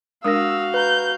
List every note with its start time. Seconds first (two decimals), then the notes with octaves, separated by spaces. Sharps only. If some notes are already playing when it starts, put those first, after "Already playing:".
0.24 G#3 D4 F#4 A#4 F5 D#6 E6 A#6
0.74 B4 A#5 G6